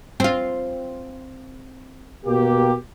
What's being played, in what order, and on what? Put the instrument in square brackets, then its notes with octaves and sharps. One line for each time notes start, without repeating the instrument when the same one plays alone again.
[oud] C4 F4
[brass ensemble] B2 A#3 G4